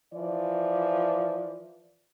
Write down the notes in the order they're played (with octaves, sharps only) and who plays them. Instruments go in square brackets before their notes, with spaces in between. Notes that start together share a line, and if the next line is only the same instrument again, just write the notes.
[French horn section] E3 F3 D5